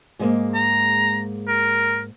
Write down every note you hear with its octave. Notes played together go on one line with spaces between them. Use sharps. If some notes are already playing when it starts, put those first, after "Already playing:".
G#2 G#3 A#3
A#5
A#4